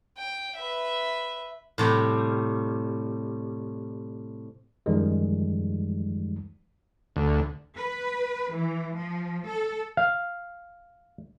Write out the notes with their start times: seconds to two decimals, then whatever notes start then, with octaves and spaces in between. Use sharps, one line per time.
0.17 G5
0.56 B4 E5
1.78 A2 C3 G3
4.86 F#2 D#3 F3 G3 G#3
7.16 D2
7.76 B4
8.53 E3
8.96 F3
9.47 A4
9.97 F5